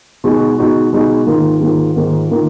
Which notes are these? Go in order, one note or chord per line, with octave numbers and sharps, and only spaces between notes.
B2 G#3 D#4 F#4
B2 G#3 D#4 F#4
B2 G#3 D#4 F#4
G#2 D#3 A#3 F4
G#2 D#3 A#3 F4
G#2 D#3 A#3 F4
D#3 A#3 F4